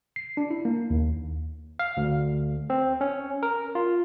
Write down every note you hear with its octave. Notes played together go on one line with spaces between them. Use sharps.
C7
D4
E4
A#3
D#2
F5
D2
C4
C#4
A#4
F4